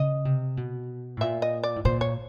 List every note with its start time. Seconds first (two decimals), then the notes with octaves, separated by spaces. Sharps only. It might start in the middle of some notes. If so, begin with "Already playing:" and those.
Already playing: C#3 D#5
0.25 C3
0.57 B2
1.17 A2
1.21 A#2 E5
1.42 D#5
1.63 D5
1.76 A2
1.85 A#2 C5
2.01 C#5